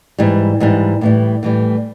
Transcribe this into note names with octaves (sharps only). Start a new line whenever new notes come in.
G#2 E3 G3
G#2 E3 G3
A2 E3 G3
A2 E3 G3